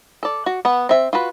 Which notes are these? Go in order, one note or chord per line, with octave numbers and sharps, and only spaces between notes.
A4 D5
F#4
B3 F#5
C4 E5
F4 F#4 B4